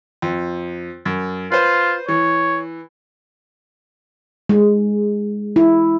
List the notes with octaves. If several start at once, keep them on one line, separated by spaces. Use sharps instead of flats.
F2
F#2
F4 B4 C5
E3 C#5
G#3
E4